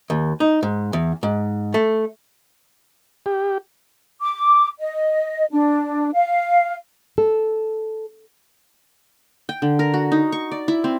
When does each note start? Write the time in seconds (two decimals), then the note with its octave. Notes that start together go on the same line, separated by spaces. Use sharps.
0.10 D#2
0.40 D#4
0.63 G#2
0.93 E2
1.23 G#2
1.74 A3
3.26 G4
4.21 D6
4.79 D#5
5.51 D4
6.14 F5
7.18 A4
9.49 G5
9.62 D3
9.79 A#4
9.94 F#4
10.12 D#4
10.32 C#6
10.52 D5
10.68 E4
10.84 C4